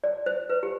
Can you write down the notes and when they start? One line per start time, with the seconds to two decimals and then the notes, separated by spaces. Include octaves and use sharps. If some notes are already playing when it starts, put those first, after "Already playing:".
0.04 D5
0.26 C5
0.50 B4
0.63 G4